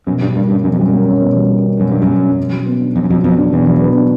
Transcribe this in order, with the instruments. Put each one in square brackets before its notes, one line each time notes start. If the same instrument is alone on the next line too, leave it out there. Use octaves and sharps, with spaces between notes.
[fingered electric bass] F#2 [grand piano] B2
[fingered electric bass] G2 [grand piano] G3
[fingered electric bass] G2 [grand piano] A#3
[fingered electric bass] G2 [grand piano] C#4
[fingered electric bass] F#2 [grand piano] B2
[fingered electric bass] F2
[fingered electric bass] F#2 [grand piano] G3
[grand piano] A#3
C#4
B2
G3
A#3
C#4
[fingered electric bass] F#2 [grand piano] B2
[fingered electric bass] G2 [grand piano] G3
[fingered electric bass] F#2
[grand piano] A#3
C#4
B2
F#3
B3
D4
[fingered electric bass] F2 [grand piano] B2
[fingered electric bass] F#2
[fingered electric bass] F2 [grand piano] F#3
[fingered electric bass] F2 [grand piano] B3
[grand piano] D4
[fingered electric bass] E2 [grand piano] B2
[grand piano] F#3
B3
D4